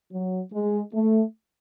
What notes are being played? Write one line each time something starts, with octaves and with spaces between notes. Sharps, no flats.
F#3
G#3
A3